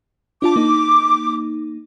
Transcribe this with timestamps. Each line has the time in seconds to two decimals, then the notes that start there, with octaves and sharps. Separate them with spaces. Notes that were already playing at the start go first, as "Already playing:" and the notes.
0.42 D4 F4 A5 D6
0.56 A#3 D#4